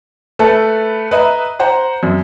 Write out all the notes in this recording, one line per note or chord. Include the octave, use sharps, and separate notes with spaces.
A3 A4 B4
B4 D#5 E5 A#5
C5 F#5 A#5
F#2